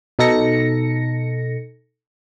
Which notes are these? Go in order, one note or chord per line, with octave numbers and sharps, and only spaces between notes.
B2 D#4 A4 A#6 C#7